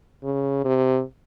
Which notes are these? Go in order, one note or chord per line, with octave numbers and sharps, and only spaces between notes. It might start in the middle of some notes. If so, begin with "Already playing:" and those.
C#3
C3